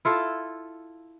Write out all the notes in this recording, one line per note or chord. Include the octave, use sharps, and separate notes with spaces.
E4 F4 A4